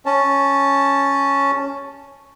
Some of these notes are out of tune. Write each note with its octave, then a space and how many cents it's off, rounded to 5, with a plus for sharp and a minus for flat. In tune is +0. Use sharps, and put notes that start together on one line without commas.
C#4 +0 A5 +0